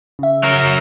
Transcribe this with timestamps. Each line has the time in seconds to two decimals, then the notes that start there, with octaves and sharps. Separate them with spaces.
0.19 C#3 E5
0.43 F#3 A#4